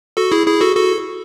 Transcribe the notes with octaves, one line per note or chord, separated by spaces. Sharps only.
F#4 A4
E4 G#4
E4 G#4
F#4 A4
F#4 A4